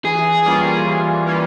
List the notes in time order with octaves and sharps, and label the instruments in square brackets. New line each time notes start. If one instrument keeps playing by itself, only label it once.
[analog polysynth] E3 [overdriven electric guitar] G#4
[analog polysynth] G3 A#3 C#4 F4
E3
G3 A#3 C#4 F4